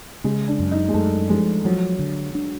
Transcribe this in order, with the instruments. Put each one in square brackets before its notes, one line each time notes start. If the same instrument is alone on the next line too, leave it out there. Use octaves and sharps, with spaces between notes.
[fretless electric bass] C#3 [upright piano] G#3
[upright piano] D4
[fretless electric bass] F#2
[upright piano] D#4
G#3
[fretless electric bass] F#2 [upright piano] A3
[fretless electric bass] F3 [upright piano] G#3
[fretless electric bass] F3 [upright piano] F#3
[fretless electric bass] D3
D4